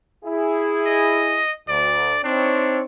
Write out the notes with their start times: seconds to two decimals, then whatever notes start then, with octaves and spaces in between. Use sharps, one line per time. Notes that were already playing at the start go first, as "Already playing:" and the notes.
0.25 E4 G#4
0.86 D#5
1.69 D2 D5
2.24 C4 D4 D#4 C#5